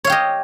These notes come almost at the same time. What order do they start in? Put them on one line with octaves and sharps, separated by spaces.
C#5 F5 G4 D#5